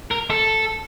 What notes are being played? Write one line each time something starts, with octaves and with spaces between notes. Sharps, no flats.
A#4
A4